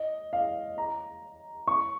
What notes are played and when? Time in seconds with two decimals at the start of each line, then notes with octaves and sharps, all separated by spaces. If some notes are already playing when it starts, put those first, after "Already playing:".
Already playing: D#5
0.33 F5
0.78 A#5
1.67 C#6